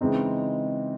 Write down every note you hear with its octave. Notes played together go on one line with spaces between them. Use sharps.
C#3 E3 G#3 C4 D#4